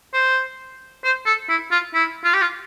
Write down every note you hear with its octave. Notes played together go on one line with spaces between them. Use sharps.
C5
C5
A4
E4
F4
E4
F4
G4
F4